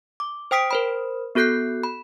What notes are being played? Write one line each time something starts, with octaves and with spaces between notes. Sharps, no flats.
D6
C5 G5 D#6 B6 D7
A#4 C5 B5
B3 F#4 A4 F#6 G6 C7
B5